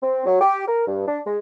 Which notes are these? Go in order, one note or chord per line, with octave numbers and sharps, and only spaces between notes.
C4
F#3
G4
A#4
G2
D4
G#3